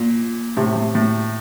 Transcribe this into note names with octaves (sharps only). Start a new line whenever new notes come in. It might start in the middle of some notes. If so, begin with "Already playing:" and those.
Already playing: A#2
A2 C3
A2
A2